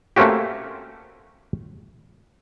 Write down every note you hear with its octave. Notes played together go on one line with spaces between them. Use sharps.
A3 A#3 C4 C#4 F#4 G4